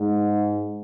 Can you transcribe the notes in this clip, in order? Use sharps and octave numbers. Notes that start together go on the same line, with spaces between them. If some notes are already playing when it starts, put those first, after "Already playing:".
Already playing: G#2